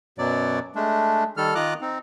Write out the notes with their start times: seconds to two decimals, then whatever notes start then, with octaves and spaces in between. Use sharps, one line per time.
0.18 F#2 B2 F#3 D5
0.75 G#3 A3 D4
1.37 D#3 G3 A4 F6
1.55 D#3 F4 D#5 A#5 D6 F#6
1.81 C4 D#4